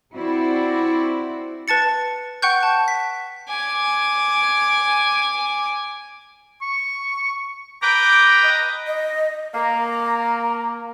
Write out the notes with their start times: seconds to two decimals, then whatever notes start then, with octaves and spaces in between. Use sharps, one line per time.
0.14 C4 E4 F#4 C5 D5
1.68 B4 A5 A6 C#7
2.42 F#5 G5 C#6 F#6 G6
2.63 A5
2.88 B6
3.49 G#5 D6
6.61 C#6
7.82 B4 G5 A#5 D6
8.44 D#5
8.87 D#5
9.54 A#3 A#5